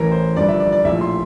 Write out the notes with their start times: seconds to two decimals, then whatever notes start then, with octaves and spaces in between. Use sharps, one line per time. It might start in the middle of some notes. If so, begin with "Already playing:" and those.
Already playing: A1 A2 E3 A#4
0.12 C5
0.36 G1 G2 F3 D5
0.49 E5
0.60 D5
0.72 D5
0.84 A#1 A2 F3 E5
1.01 C6